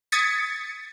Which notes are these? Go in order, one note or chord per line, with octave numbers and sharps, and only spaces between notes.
D#6 G#6 A6 B6 C#7